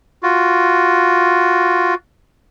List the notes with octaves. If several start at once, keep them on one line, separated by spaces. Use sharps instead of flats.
F4 F#4